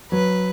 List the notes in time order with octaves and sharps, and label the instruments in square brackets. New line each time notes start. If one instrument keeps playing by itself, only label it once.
[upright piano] F#3 [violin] B4